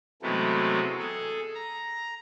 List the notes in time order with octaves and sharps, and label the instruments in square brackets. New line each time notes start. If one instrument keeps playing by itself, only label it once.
[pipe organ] C3 E3 F#3 G#3 A3 B3
G#4 A4
A#5